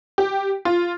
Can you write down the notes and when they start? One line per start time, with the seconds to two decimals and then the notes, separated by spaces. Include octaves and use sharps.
0.18 G4
0.65 F4